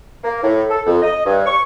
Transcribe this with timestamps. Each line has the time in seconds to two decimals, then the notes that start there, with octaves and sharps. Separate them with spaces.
0.24 A#3
0.42 A2
0.70 A4
0.86 F2
1.02 D#5
1.25 G2
1.46 C#6